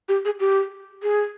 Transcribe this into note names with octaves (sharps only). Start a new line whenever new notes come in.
G4
G#4
G4
G#4